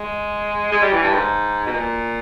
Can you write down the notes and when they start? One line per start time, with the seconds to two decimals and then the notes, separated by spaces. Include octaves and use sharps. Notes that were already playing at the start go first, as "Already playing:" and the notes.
Already playing: G#3
0.72 G#3
0.82 G3
0.92 E3
1.03 G2
1.14 G#2
1.66 B2
1.75 A#2